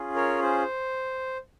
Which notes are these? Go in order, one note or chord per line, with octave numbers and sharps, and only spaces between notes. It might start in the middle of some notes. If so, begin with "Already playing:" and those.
Already playing: C#4 F4 G#4
A#4 C#5
C5